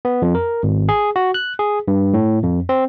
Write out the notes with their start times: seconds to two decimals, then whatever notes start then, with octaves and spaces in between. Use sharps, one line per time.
0.05 B3
0.22 F2
0.35 A#4
0.63 G#1
0.89 G#4
1.16 F#4
1.34 F#6
1.59 G#4
1.88 G2
2.14 A2
2.43 F2
2.69 C4